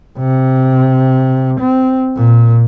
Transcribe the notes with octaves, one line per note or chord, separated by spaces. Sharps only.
C3
C4
A#2